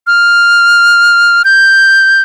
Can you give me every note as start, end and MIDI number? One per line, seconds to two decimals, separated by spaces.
0.07 1.42 89
1.45 2.22 91